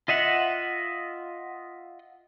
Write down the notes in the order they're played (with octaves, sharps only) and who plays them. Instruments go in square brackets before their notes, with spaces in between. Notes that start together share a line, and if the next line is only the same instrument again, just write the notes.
[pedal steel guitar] F4 D#5 E5 F#5